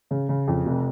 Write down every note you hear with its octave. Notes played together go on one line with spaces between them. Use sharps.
C#3
C#3
F2
F1